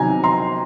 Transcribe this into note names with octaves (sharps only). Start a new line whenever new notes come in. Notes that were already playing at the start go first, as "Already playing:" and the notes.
Already playing: C3 D#3 F#3 G#5 A#5
A#5 C6